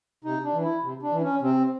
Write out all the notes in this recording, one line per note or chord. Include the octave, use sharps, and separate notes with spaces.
C3 D#4
D4
E3
E4
C3
D4
E3
C#4
C3 C4